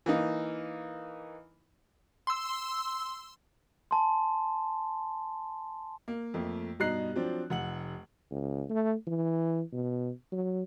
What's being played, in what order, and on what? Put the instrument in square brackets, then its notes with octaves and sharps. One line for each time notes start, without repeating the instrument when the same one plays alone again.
[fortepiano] E3 A#3 D#4
[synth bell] C6 E6
[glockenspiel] G#5 A5 C6
[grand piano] A#3
F2 A3 A#3
G2 B2 D#4 A#5 F#6 C7
F3 F#3 C4 D4
F1 F#5 F#7
[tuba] C#2
A3
E3
B2
F#3